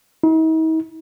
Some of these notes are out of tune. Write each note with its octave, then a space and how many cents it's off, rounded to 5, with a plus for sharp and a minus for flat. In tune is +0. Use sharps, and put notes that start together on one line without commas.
D#4 +45